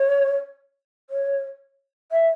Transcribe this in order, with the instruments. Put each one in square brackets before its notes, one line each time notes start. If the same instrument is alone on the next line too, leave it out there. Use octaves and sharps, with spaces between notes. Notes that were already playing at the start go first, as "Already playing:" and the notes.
Already playing: [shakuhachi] C#5
C#5
E5